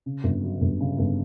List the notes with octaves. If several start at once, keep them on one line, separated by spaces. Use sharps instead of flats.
C#3
G1
F#3
G1
C#3
G1